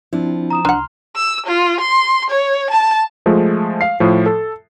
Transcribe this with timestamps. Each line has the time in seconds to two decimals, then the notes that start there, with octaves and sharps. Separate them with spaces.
0.13 F3 C4 D4 E4
0.50 A#5 D#6 E7
0.65 C2 D4 F#5 A#5 C6 F6
1.16 E6
1.47 F4
1.80 C6
2.30 C#5
2.70 A5
3.26 F3 G#3 A3
3.81 F5 C7
4.00 A2 F3
4.26 A4